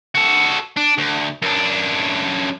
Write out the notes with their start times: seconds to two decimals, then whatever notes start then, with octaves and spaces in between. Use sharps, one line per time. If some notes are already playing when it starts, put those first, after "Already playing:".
0.15 F#4 A4
0.76 D4
0.98 D2
1.42 F#2 D4